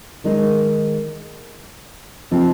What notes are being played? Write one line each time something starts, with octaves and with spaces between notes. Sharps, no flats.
D#3 G#3 D#4
C3 F3 C4 D#4